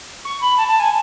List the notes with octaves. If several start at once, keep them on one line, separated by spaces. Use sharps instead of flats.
C#6
B5
A5
A5
G#5